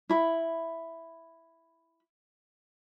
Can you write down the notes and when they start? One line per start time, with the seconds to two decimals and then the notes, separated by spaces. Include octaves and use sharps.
0.09 E4 B5